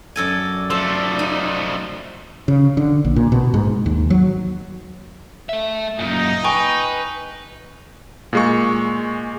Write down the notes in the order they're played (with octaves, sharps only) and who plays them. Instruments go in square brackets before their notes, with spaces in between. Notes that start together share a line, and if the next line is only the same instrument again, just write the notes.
[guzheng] F#2 A4 G#5 [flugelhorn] D5
[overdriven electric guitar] F3 A3 [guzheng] A4
[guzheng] D#4
[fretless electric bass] C#3
D3
A#1
A#2
B2
G#2
D#2
F#3
[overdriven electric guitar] A3 E5
[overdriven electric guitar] F#2 A#2 [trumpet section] D#4
[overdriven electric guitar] B4 [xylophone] G5 G#5 C#6
[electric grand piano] A#2 G#3 C#6